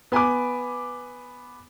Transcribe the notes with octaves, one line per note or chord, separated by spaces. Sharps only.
B3 G#5 B5 D6